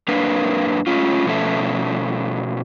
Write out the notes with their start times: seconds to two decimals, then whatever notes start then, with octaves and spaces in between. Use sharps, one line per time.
0.08 F#2 A#3 D4 A#4 B4 F5
0.87 A3 C#4 F4
1.26 B2 F3 A3 C#4 A4 E5